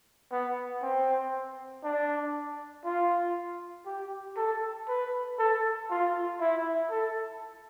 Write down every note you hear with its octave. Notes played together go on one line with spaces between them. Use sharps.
B3
C4
D4
F4
G4
A4
B4
A4
F4
E4
A4